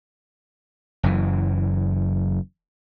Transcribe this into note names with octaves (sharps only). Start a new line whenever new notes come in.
F#1 F#2 E3